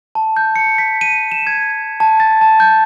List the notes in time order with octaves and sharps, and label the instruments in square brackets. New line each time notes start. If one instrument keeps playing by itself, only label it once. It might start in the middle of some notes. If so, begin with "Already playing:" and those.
[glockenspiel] A5
G6
C#7
B6
D#7
E7
G#6
A5
A6
A5
G6